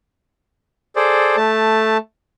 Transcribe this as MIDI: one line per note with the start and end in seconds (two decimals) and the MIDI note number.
0.96 1.36 68
0.96 1.36 69
0.96 1.36 72
0.96 1.36 74
1.37 1.97 57
1.37 1.97 81